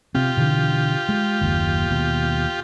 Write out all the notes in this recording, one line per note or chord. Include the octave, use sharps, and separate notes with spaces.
C3 C4 F4 G4
B2 D3 E3
G#3
F#1 D#2
D#2 B2